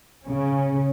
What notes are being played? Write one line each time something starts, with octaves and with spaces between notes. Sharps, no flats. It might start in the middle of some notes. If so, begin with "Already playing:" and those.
C#3 C#4